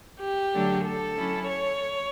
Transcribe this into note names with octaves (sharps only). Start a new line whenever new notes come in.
G4
D3 F#3 A3 D4
A4
F#3 C#4 E4
C#5